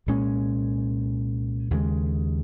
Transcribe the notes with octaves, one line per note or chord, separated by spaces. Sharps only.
C2 A#2 G#3 C#4
D#2 C#3 G#3